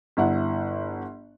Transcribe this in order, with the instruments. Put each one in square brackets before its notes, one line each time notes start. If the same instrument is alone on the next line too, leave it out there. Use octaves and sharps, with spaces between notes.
[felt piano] G1 E4 F#5